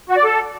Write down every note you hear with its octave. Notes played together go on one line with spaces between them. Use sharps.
F#4
D5
A4